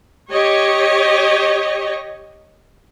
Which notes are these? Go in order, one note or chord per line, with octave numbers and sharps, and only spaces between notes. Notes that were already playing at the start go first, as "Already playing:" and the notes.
G4 C#5 D#5